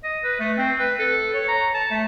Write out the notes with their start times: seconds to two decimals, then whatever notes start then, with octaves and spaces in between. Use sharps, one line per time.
0.04 D#5
0.24 B4
0.40 A3
0.58 C4
0.79 B4
0.99 A4
1.34 C#5
1.48 A#5
1.74 A5
1.91 A3